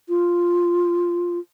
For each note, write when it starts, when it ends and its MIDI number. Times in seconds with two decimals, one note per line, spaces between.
0.09 1.39 65